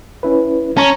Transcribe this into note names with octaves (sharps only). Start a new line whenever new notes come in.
C#4 E4 B4
C#4 A5 A#5 C#6